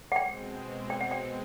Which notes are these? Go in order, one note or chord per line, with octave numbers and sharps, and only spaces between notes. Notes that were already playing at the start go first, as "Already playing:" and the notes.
F#5
B2 G#3 C4 G5
G5
F#5
G5